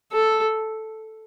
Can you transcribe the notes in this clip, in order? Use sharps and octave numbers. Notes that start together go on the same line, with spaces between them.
A4